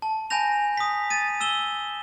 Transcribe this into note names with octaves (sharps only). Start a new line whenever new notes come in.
A5
G#5 A5 B5 G6 A#6 F7
D#6 B6
A6 D#7
E6 E7 G7